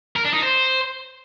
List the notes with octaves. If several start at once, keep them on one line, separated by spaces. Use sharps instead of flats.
A#4
D4
D#4
C5